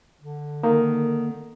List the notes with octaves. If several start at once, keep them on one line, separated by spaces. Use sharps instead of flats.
D3
D#3 A#3